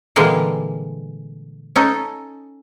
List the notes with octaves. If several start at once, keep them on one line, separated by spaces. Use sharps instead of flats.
A#2 D3 E3 G3 G#3 A#3
C#4 D#4 A4